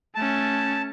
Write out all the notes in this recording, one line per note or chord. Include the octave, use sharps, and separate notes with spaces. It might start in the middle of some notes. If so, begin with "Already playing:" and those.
A3 C#4 A5